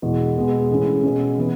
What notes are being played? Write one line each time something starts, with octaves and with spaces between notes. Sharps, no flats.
E2 B2 G#3
B2 G#3 B3
A2 E3 G#3 C#4 E4
B2 G#3 C#4
E3 B3 E4